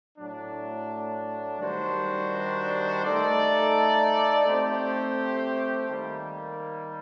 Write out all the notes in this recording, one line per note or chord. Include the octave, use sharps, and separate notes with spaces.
A2 F#3 A3 D4
D#3 G3 D4 F#4 C5
A3 D#4 A4 D5
A3 C4 G4 C5
D#3 G3 A#3